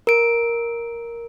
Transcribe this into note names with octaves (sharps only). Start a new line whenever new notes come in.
A#4 D7